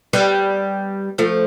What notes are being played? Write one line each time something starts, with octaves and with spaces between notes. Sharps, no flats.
G3 B3
F3 A3